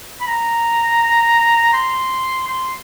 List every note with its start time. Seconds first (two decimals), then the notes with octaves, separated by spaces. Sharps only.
0.21 B5
0.27 A#5
1.73 C6
2.48 C6